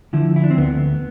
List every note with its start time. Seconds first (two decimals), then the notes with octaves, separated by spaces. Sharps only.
0.13 D3 F3 E4
0.36 E4
0.44 D4
0.51 C4
0.57 D2 B3